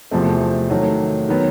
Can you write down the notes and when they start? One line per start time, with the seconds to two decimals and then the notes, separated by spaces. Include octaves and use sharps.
0.11 E2 C3 F3 A3 C4
0.70 D#3 F#3 A3
1.29 D#3 F#3 B3